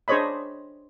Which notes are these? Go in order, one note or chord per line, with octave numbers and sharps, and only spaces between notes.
D4 G#4 C5 C#5 D#5 B5